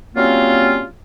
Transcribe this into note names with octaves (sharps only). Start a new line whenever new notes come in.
F#3 G3 A#3 C4 C#4 F4